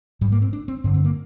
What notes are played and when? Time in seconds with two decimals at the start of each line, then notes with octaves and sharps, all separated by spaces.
0.21 G#2 G3
0.32 A#3
0.42 C4
0.53 D4
0.68 C4
0.84 G2 D3 C4
0.94 C4
1.05 A#3